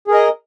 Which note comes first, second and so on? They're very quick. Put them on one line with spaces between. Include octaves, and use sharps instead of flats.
G#4 A#4 D#5